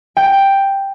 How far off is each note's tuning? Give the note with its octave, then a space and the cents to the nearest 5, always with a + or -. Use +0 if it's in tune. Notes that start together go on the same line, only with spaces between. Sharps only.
G5 +5